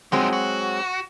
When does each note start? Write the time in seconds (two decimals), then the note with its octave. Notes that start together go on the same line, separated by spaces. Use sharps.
0.12 F3 F#3 G#3 C4 D#4
0.33 F#4